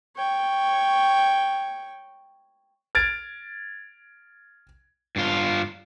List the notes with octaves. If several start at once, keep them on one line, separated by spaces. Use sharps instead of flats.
C#5 G5
F6 G#6 A6 D7
G2 F4